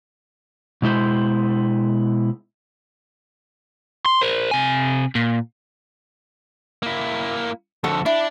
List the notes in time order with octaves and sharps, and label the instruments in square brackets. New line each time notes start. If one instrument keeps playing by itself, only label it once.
[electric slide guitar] B2 G#3 E4 C5
[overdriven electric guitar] C6
A#4 C5
C3 G#5
A#2
[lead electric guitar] A#3 E4
[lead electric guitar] F2 D3 [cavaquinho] F#4 A4
[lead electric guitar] D4 [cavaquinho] E4